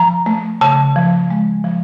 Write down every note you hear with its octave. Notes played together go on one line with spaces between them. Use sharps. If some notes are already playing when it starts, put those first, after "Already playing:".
Already playing: F3 A#5
A3
C#3 A5
F3
G#3
F3